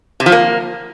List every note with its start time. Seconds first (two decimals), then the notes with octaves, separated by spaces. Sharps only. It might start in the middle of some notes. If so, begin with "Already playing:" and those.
0.20 C3
0.26 F3
0.32 A#3